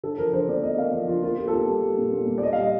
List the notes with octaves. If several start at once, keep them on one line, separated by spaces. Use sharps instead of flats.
D3 A4
F3 A#4
D3 C5
A#3 D5
A#3 D#5
A#3 F5
F3
D3 F4
A#3 F4
A#3 G4
A4
A#3 G4
G3
G3
A#2
A#2
G3
D5
G3 D#5
G3 F5
D#5